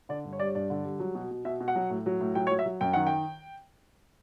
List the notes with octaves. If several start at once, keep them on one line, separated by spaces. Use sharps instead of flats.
D3 D5
G2
C#5
G3 D5
C#5
G2 D5
D3
G3
F#3
B2
B2
B2 E5
B2
F#5
F#3
A2
F#3
A2
F#3 G5
C#5
F#3
E5
F#3
F#2 G5
D#3 F#5
G5